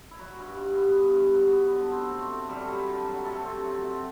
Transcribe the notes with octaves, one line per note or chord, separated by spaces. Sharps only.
E4
F#3 F#4
G2
G2
B3
G2
G2
F#3
B3
D3
C4
A3
A3
F#3 G3 G4
F#3
D3
F#3
C3 A3 A4
C4
F#3
C3